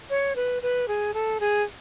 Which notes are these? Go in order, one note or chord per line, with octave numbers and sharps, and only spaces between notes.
C#5
B4
B4
G#4
A4
G#4